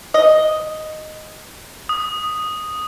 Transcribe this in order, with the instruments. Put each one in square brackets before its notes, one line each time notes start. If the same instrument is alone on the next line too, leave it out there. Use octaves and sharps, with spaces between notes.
[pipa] D#5
[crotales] D#6